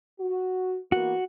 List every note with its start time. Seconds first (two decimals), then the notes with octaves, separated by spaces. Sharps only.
0.20 F#4
0.92 E3 A#3 B3 F#4